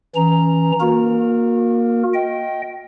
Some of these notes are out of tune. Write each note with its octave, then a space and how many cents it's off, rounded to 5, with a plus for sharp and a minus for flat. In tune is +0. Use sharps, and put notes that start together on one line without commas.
E3 -15 C#4 +0 A#5 +0
A#3 +10 F#4 -35 A#4 +0
D#5 +15 G5 -15